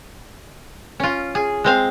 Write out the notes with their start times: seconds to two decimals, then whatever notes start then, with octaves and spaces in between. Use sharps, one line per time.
1.00 C#4 F4
1.35 G#4
1.64 G#3 C4 F5